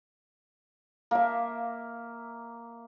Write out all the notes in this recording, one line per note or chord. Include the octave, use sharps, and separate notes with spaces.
A#3 E5